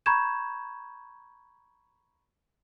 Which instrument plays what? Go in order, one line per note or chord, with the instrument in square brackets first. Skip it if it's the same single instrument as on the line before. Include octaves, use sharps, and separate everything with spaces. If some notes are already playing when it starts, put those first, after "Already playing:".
[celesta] A#5 B5 C#6 G6 G#6 E7